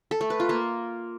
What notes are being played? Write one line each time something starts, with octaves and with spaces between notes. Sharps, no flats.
A4
A3
B4
F4
A#3